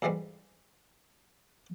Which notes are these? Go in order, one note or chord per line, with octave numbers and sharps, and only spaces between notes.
D2 G#2 E3 G3 G#3